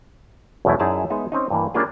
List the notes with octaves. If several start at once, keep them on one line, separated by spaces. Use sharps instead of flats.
B1 E2 B2 A3 E4
F#2 D#4 E4 G#4 D5 A5
G#3 B3 D#4 E5
C4 C#4 D#4
G2 E3 A#3
G3 A#3 C#4 D4 F4 G#4